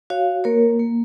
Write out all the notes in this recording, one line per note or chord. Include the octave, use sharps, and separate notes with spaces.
F#4 C#5 F5
A#3 A#4 C#5
A#3